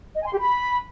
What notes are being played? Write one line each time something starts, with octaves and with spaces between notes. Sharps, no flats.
D#5
G#5
C6
G4
B5